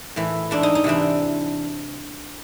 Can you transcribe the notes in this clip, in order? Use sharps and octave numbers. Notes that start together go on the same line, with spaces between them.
A2 E3
G#2 E3 D4
D#4
D#4
E2 C3 E3 D4